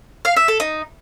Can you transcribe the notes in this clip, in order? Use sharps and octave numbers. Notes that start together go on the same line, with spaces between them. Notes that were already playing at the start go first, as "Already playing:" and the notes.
F5
E5
A4
D#4